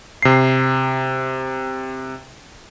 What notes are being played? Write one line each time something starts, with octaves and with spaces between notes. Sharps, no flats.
C3 C7